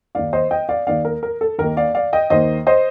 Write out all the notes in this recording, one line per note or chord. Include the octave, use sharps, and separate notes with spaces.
D#2 D#3 A#3 D#4 D5 F5
C5 D#5
D#5 G5
D5 F5
D#2 D#3 A#3 D#4 D5 F5
A#4
A#4
A4
D#2 D#3 A#3 D#4 A#4
D5 F5
D5 F5
D#5 G5
D#2 D#3 A#3 D#4 C5 D#5
C5 D#5